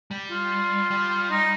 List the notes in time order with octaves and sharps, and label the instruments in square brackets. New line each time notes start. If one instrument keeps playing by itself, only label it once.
[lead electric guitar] G3
[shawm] F4
[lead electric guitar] G3
[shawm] D#4